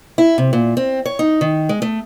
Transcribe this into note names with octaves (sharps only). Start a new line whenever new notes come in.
E4
C3
A#2
C4
C#5
D#4
D#3
G#3
A3